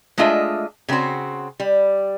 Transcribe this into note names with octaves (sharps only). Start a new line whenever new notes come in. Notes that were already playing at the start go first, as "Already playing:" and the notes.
G#3 A3 D4 F4 D#5 E5
C#3 A3 C4 F#4 C5
G3